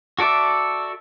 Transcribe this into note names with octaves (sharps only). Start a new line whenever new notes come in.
F#4 A4 D5 E5